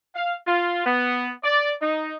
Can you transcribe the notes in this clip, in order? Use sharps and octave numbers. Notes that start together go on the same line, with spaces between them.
F5
F4
B3
D5
D#4